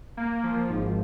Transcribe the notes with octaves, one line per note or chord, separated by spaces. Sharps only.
A#3
F3
G#1